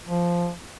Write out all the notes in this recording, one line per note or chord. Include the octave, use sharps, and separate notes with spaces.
F3